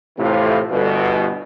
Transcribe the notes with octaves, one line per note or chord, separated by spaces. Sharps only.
A2 C3 E3 F4
G1 B2